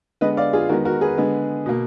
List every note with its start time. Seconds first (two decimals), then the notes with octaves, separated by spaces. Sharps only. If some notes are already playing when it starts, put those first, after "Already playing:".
0.21 D3 G#3 B3 B4 D#5
0.37 D5 F5
0.53 F4 G#4
0.69 D#3 G#3 B3 F#4 A#4
0.85 F#4 A#4
1.01 G#4 B4
1.17 D3 G#3 B3
1.66 B2 A#3